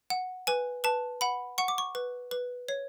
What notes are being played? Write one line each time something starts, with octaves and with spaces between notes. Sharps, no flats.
F#5
B4 G#5
B4 A5
F#5 B5
F#5 C#6
D6
C#6
B4
B4
C#5